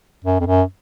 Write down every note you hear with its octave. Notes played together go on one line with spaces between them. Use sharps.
F#2
F2
F#2